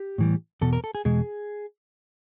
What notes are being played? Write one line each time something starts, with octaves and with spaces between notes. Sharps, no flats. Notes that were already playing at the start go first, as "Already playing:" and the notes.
Already playing: G4
A2 E3 G3
E2 B2 A4
A#4
A4
G#4
E2 B2 G#3 G#4